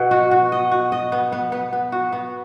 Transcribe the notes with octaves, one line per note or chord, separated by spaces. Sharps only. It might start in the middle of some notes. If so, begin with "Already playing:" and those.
Already playing: B2 B3 D#5 F#5
F#4
F#4
D#5
F#4
D#5
B3
B3
B3
B3
F#4
B3